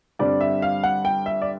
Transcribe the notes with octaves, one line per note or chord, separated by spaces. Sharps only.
G2 D3 G3 C4 D5
E5
F5
F#5
G5
E5
D5